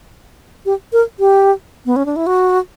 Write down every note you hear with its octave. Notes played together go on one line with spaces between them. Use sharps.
G4
A#4
G4
B3
C#4
D4
E4
F#4